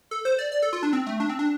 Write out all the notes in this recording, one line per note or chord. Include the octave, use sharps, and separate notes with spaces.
A4
C5
D5
D5
A4
F4
D4
C4
A3
D4
C4
D4